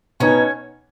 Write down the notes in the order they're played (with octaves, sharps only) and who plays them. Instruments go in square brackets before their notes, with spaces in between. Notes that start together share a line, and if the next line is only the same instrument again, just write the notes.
[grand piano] B2 B3 D#4 [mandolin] C#4 C#5